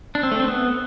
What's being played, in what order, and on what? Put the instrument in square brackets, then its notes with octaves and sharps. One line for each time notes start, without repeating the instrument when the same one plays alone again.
[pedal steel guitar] D4
C4
A3
C4
B3